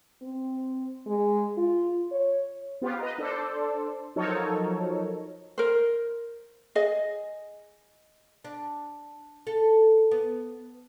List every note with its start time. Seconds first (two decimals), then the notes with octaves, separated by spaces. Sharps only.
0.22 C4
1.07 G#3
1.57 F4
2.11 C#5
2.82 B3 F4 G4
2.99 B4 D#5 A#5
3.18 D4 A4 C5 D5
4.16 F3 F#3 D#4 A4 A#4 C#5
5.58 A#4 C5
6.75 G#4 D#5
8.45 D4
9.47 A4
10.11 B3